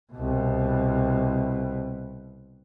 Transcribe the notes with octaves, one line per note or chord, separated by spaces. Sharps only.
C2 B2